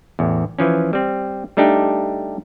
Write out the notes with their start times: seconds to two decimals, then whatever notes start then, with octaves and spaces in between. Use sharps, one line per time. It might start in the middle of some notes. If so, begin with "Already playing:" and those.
0.19 A1 E2
0.59 E3 F3 C#4
0.93 G3 C4
1.57 G3 A3 D4 D#4 G4